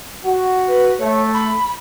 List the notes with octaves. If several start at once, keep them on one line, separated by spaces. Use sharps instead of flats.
F#4
B4
A3 C#5
B5